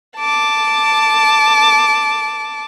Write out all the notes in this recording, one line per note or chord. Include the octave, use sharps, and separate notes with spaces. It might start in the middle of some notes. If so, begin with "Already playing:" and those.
A5 D6